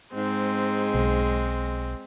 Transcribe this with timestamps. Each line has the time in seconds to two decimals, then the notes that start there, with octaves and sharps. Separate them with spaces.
0.15 G#2 G#3 C4
0.94 B1